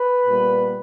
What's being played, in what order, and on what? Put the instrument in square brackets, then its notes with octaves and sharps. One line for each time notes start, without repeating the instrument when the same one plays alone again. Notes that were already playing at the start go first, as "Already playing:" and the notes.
Already playing: [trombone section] B4
A#2 G3 B3